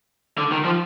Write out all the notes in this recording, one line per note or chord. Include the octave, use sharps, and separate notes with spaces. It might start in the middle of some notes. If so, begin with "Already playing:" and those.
D3
D#3
F3